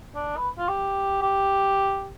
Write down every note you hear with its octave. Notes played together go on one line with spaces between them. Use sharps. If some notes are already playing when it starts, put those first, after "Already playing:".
D4
B4
F4
G4
G4